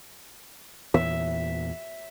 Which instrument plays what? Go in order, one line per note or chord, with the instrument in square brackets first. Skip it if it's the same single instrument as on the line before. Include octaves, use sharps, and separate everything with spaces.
[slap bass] E2 A#2 E3 [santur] E5